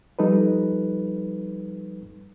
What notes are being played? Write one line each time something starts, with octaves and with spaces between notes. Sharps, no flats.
F3 G3 D#4 A4 B4